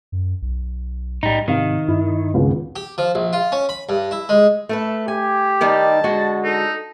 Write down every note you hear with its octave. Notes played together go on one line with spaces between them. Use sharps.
F#2
B1
A2 G3 D#4
G#2 C3 D#3 F5
G2 E4
G#1 C#2 B3
G4
F3
A#1
F4
C#4
B5
G2
E4
G#3
A3 A4 B4
G4 G#5
D#3 G3 D#4 A5
D3 G#3 F#4
D#4 A4